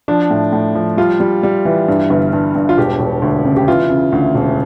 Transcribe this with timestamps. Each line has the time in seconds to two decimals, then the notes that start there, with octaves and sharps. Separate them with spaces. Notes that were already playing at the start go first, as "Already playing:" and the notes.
0.08 F3 D4
0.30 A2
0.52 A2
0.75 F3
0.97 G3 F4
1.20 G3
1.43 G3
1.65 E3
1.88 G2
2.10 G1
2.33 G2
2.55 G2
2.69 F4
2.78 E1 G4
2.99 E1
3.22 D2
3.45 C#3
3.57 G4
3.68 E3 F4
3.90 C#3
4.12 D2
4.35 E1